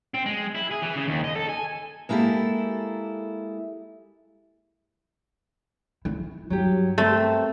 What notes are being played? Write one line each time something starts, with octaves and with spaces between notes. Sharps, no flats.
C4
G#3
E4
G#4
E3
C#3
D#2
D#5
A4
G#5
G#3 A#3 E4 G4 A4
E4
G2 F#3 G4
A3 C4 A#4 C5